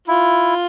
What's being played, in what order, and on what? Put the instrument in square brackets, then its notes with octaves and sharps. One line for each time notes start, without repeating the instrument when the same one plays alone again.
[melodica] E4 [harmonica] F4